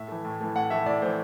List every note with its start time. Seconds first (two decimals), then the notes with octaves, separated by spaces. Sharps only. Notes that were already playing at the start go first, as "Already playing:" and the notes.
Already playing: A2 E5
0.08 E3 A3
0.25 A2
0.40 E3 A3
0.56 A2 F#5
0.70 E3 A3 E5
0.86 A2 D5
1.02 E3 A3 C5